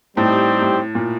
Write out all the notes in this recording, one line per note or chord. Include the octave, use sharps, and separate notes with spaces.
A2 G3 C4 D#4 G4
A2
A#2